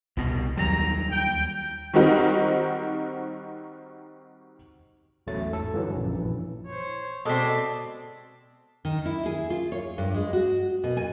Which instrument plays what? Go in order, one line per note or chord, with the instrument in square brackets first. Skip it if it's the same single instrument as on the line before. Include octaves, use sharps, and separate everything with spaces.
[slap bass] C2 B2
[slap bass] D#2 F#3 G3 [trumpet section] A#5
[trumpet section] G5
[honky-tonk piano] D#3 G3 C4 D#4 F#4 A#4
[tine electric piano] A1 E2 F#3 A3 A6
G#2 A4
G2 D3 E3 F#3
A#1 F#2 A#2
A#1 E3
[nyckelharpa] C5 C#5
[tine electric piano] B2 D6 B6 [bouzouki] G#3 C4 [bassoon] A4 [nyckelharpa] D5 A5
[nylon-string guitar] D#3
E4
G#4
F4
C#5
G2
G#3
F#4
B2
G#5